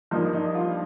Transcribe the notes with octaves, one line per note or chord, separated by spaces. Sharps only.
G2 F3 A#3 D#4
D#4
F4